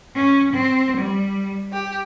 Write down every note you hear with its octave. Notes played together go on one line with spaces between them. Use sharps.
C#4
C4
G3
G4